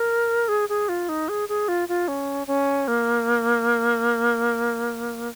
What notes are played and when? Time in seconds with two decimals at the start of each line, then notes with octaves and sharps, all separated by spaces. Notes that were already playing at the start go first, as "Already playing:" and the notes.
Already playing: A#4
0.48 G#4
0.69 G#4
0.89 F4
1.09 D#4
1.29 G#4
1.49 G#4
1.68 F4
1.89 F4
2.08 C#4
2.47 C#4
2.88 A#3